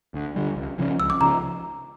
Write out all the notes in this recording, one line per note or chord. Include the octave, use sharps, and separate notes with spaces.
D2
D3 G3
C#2
C#3 F3 C#4
C#2 E6
D6
C#3 F3 A#5